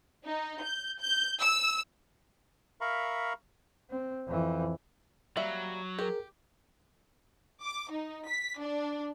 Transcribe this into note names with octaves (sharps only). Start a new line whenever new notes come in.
D#4
G6
G6
E6
A#4 E5 F5 A#5 B5 C#6
C4
F2 E3
F#3 G3 A#3 E5
G4 G#4 A#4
D6
D#4
B6
D4